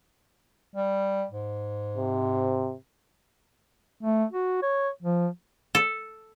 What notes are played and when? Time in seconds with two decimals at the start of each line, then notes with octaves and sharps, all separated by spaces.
0.76 G3
1.31 G#2
1.97 C3
4.03 A3
4.32 F#4
4.62 C#5
5.03 F3
5.75 A4